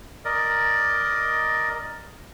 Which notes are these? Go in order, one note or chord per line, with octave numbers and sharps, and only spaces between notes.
A#4 D5 D#5